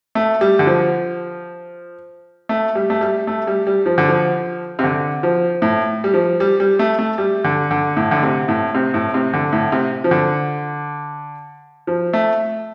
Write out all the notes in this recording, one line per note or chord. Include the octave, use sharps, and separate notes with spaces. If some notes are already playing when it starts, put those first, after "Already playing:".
A3
G3
D3
F3
A3
G3
A3
G3
A3
G3
G3
F3
D3
F3
C3
D3
F3
A2
G3
F3
G3
G3
A3
A3
G3
D3
D3
A2
D3
C3
A2
C3
A2
C3
D3
A2
C3
F3
D3
F3
A3